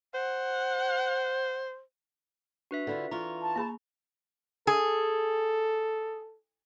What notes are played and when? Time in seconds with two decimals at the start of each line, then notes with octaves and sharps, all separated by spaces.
0.15 C5 F#5
2.71 D4 F#4 B4 E5
2.87 D3 E4 F4
3.11 E3 F4 A#5 C#6
3.42 A5
3.56 A#3 G#4 B5
4.67 G#4 A4